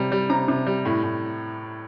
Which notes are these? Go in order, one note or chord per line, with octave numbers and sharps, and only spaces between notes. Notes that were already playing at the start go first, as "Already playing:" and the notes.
Already playing: C3 G3
G3
C3 A#5
C3
G3
A2
A2